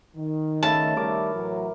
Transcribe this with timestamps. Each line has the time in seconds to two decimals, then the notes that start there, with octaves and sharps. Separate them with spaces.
0.16 D#3
0.63 C#3 A3 E4 A5
0.97 D#3 G3 A3 A#4 D6
1.34 A2 E3 F#3